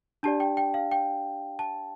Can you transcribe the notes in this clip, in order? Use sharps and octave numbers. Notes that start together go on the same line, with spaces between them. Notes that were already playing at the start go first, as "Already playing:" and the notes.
D4 G4 D5 A5
G5
G5
F5
G5
A5